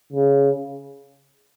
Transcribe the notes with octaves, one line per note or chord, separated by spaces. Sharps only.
C#3